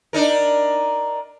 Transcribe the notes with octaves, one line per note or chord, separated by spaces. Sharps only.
D4 D#4 A#4